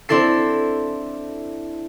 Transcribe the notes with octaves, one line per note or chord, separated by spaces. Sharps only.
C4 D4 E4 A4 C7